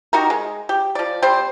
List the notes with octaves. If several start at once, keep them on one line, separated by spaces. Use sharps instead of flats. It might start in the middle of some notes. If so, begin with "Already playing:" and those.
D#4 F#4 G4 A#4
G#3
G4
F3 D5
G3 C4 C5